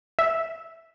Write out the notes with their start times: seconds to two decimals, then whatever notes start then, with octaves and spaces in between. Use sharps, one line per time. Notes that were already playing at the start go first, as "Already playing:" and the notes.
0.19 E5